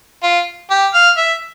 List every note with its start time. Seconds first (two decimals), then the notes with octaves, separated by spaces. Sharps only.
0.23 F4
0.70 G4
0.94 F5
1.17 E5